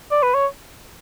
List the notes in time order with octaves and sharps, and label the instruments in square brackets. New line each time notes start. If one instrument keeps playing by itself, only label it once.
[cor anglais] D5
B4
C#5